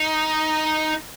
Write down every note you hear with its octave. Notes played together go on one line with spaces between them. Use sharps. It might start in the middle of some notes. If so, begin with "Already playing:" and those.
Already playing: D#4